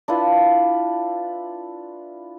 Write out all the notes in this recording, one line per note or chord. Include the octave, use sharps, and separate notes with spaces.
D4 E4 F4 B4